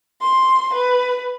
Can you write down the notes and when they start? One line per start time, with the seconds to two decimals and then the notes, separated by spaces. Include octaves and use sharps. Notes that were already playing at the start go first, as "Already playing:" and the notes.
0.21 C6
0.74 B4